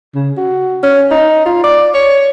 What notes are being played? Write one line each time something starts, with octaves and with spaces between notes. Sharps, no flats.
C#3
F#4
C#4
D#4
F4
D5
C#5